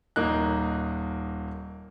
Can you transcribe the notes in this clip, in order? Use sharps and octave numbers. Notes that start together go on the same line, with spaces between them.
D#1 A#3 D#4 F#6